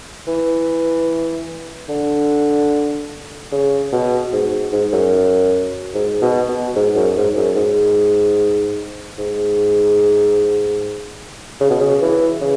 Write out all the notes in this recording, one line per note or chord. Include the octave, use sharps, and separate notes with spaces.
E3
D3
C#3
B2
G#2
G#2
F#2
G#2
B2
B2
G#2
F#2
G#2
F#2
G#2
G#2
C#3
B2
C#3
E3
C#3